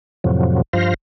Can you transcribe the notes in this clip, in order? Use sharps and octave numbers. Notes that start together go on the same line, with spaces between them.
F2 A2 C3 F3 F#3
G2 F3 F4 C5 F5 A#6